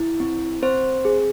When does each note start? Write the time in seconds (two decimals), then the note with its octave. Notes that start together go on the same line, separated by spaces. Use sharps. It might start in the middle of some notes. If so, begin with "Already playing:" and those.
Already playing: E4
0.20 C4
0.63 C4 C5
1.05 G#4